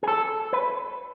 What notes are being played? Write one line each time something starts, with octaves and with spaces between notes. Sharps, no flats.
G#4
A4
B4